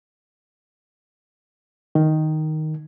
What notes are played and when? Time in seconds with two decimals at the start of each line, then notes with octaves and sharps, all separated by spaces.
1.95 D#3